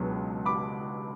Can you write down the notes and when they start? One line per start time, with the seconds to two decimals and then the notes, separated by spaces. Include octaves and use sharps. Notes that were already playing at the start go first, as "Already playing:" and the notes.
Already playing: C#2 B2 F#3 B3 D4
0.45 B5 D6